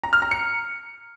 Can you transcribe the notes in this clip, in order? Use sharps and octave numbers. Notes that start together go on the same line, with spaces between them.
A#5
F6
A#5
C#7